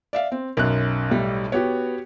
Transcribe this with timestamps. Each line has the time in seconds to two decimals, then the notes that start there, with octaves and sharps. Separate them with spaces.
0.13 D5 E5 F5
0.32 C4
0.57 B1 F#2 A#4 F#6
1.10 A2 G3
1.52 B3 F#4 G4 C#5